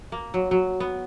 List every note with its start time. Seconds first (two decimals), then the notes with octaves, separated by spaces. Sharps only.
0.12 A#3
0.34 F#3
0.51 F#3
0.80 B3